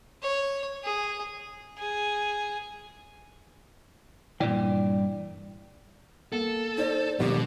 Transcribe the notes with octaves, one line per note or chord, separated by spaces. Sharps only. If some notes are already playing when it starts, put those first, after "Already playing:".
C#5
G#4
G#4
G2 A#2 E3 D5 G5
A#3 A4
D#4 C5 D5
G1 D#2 B2 G4